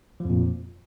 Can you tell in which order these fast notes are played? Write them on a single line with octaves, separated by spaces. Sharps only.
F3 F2 A#2